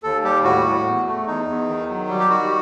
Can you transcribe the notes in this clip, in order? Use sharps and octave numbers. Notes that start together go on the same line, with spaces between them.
D#2 A4
G3 G4
A2 F#4
A2
E2
A3
E2 D#4
E2
D#3
F#3
G3
G4
D#3 F#4